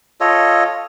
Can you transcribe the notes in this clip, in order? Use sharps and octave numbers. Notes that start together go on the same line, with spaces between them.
F4 A4 C#5 D#5